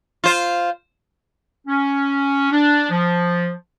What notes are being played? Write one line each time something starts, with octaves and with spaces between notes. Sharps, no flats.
F4 C5
C#4
D4
F3